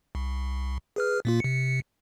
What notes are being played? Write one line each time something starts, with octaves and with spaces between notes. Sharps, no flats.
C2
G#4 B4 F6
A#2 A#3 F4
C3 C#7